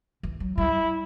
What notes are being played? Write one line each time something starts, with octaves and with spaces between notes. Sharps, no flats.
E3
F#3
G3 E4